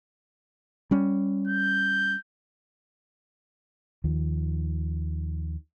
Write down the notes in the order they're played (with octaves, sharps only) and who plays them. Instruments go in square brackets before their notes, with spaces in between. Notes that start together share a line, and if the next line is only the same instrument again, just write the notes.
[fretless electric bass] G3 C#4
[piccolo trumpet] G6
[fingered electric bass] D#2 D#3 F3